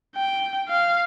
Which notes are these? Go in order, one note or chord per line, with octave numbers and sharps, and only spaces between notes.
G5
F5